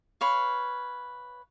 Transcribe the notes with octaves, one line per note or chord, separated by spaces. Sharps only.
B4 C#5 F5